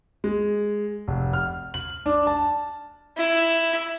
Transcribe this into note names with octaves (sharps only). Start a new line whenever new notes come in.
G#3
F1
F6
F#7
D4
A5
E4